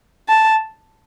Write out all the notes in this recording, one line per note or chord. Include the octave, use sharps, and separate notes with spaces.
A5